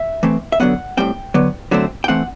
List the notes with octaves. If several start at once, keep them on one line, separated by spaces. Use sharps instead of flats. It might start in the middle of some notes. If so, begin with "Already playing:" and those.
Already playing: E5
E3 A3 C4
E5
D3 F#3 B3 F#5
A2 G3 C4 G5
D3 F#3 B3
D3 F#3 A3 C4
G5
E3 A3 C4 F#5